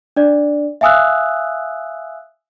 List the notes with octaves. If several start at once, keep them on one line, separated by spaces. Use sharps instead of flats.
D4 D5
E5 F5 G#5 D#6 E6 F#6